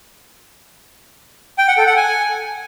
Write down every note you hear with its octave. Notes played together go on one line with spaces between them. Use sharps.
G5
F#5
A4
F#5
G#5